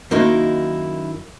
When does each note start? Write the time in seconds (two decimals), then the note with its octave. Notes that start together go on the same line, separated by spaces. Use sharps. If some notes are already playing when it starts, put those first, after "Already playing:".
0.11 F#2 D#3 A#3 D#4 E4